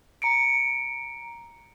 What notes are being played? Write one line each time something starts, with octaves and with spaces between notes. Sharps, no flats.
A#5 C#7 D7